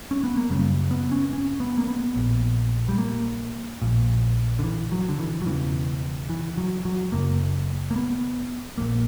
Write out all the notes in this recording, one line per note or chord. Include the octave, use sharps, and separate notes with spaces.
C#4
B3
A#3
F#1 F#2 C#3 G3
B3
C#4
C#4
B3
A#3
B3
A#1 A#2
G3
A#3
A#1 A#2
D3
E3
F#3
D3
E3
F#3
E1 E2 C#3 E3
E3
F#3
F#3
F#1 F#2 C#3 A#3
A#3
B3
A#1 A#2 A#3